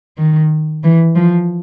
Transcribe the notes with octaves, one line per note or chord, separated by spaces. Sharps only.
D#3
E3
F3